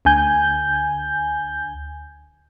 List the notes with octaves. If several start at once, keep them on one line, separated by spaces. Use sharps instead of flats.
D2 D3 G#5 G6